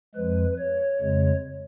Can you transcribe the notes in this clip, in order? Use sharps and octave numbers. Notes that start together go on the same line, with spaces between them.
F2 F3 G#3 B4
C#5
F2 C#3 G#3